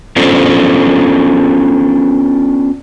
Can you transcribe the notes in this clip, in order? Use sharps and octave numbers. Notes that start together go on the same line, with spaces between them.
B3 C#4 D4 F4 A4 C5